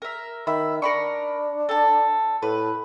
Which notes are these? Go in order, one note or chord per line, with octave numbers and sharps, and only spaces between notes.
A#4 E5
D#3 E5 B5
D4 A#4 B5 C#6
A4 A5
A2 B4